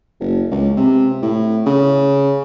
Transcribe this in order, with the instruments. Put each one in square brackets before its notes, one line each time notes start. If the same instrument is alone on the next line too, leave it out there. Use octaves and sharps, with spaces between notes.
[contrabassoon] F#1
C#2
C3
A2
C#3